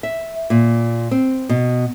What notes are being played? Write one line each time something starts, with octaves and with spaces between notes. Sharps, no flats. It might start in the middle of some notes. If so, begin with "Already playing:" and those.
E5
A#2
C4
B2